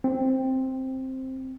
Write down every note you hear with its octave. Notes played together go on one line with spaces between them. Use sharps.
C4